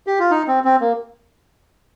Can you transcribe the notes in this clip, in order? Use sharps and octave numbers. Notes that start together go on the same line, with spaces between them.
G4
F4
D#4
C4
C4
A#3